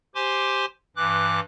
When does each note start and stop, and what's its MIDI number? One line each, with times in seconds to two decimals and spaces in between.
0.15 0.65 67
0.15 0.65 72
0.15 0.65 80
0.15 0.65 84
0.15 0.65 86
0.96 1.40 43
0.96 1.40 52
0.96 1.40 86
0.96 1.40 90